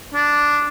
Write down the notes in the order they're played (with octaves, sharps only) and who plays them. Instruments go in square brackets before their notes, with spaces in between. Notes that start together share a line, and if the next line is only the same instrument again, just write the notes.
[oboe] D4